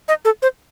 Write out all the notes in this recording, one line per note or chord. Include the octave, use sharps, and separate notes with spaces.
D#5
A4
C5